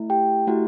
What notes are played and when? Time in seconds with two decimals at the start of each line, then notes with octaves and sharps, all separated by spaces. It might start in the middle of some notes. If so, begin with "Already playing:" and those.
Already playing: A3 E4
0.10 G4 G5
0.47 A3 E4 F#4 G4 F#5